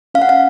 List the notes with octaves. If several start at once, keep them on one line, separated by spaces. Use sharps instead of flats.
C#4 F5
F#5
F5